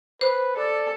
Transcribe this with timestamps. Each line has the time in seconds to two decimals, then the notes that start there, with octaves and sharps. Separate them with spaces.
0.21 B4 C5
0.56 A4 D5